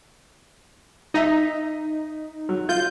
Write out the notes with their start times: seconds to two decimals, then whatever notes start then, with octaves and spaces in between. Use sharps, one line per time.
1.14 D#4 D#5 E5
2.49 F#3
2.69 F4 G6